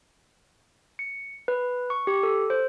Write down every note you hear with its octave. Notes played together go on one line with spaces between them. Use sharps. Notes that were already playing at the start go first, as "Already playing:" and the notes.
C#7
B4
C#6
G4
A4
C5